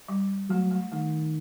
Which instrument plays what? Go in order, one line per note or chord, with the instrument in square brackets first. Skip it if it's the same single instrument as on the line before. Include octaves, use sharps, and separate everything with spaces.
[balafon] G3
[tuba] F#3 [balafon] A3
[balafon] A3
[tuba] D#3 [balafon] A3